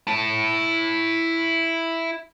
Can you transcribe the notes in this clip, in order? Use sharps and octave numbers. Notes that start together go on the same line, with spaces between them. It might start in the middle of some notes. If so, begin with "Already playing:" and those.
E4 A5